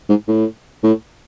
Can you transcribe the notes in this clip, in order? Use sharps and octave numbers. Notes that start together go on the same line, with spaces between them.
G#2
A2
A2